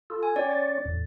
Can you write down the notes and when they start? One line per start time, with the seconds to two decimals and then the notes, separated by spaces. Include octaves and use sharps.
0.10 F4 A4
0.23 G#5
0.36 C#4 C#5 D5 G5
0.51 A6
0.85 E2 A2